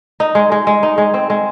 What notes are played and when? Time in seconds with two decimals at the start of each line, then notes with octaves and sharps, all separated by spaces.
0.20 D#4
0.35 G#3
0.52 G#3
0.67 G#3
0.83 D#4
0.98 G#3
1.14 C4
1.30 G#3